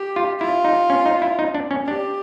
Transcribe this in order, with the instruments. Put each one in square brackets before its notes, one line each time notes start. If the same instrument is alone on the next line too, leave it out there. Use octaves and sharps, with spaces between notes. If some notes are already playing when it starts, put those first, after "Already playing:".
Already playing: [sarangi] G4
[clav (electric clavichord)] F4
[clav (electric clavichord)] E4 [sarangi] F4
[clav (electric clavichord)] D#4
C#4
D#4
E4
D#4
D4
C#4
[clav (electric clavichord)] D4 [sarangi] G4